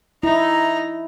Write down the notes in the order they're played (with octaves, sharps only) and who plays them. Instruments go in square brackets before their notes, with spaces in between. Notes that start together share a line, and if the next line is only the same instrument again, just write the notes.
[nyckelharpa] D#4 A#5 [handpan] E4